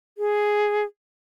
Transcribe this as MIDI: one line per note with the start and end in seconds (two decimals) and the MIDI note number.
0.18 0.84 68